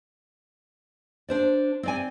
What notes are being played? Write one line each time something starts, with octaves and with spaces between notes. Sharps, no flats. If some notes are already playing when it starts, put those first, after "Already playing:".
D4 C5 D5
C4 D5 G#5